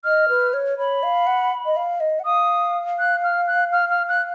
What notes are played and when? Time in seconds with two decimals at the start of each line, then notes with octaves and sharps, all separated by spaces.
0.04 D#5 F6
0.29 B4
0.54 C#5
0.78 C#5 B5
1.03 F5
1.27 F#5
1.66 D#5
1.76 F5
2.00 D#5
2.19 F#5
2.25 F5 D#6
2.99 F#6
3.24 F6
3.47 F#6
3.72 F6
3.90 F6
4.09 F#6